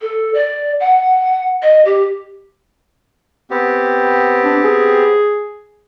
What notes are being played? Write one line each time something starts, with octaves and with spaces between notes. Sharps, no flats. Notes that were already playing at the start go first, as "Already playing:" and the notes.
A4
D5
F#5
D#5
G4
B3 C4 G4
D4
G#4